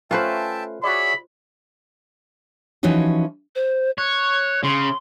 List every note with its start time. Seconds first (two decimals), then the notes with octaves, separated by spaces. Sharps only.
0.11 A3 C#4 F4 B4 C5 E5 G5 A5
0.84 F#4 G#4 C#5 D5 E5 B5
2.83 E3 F3 C#4 D#4 F#4
3.56 C5
3.98 C#5 F#6
4.63 C#3 C6